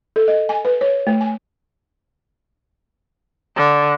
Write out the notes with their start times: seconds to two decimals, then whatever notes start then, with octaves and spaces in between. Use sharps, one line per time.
0.16 A4
0.28 D#5
0.49 G#5
0.65 B4
0.81 C#5
1.07 A3
1.21 G#5
3.57 D3